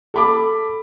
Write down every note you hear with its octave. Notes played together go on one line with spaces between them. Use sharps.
A4 B5 D6